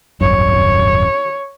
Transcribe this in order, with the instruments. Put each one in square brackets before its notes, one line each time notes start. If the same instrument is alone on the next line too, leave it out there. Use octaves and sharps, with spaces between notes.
[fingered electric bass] D#1 G#1 F#2 [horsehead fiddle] C#5